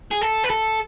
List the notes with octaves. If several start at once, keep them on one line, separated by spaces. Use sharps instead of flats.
G#4
A4
B4
A4